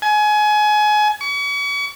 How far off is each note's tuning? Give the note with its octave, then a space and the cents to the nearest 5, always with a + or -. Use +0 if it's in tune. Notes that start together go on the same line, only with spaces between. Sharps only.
G#5 +25
C#6 +40